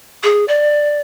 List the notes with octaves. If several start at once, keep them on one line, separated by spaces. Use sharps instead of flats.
G#4
D5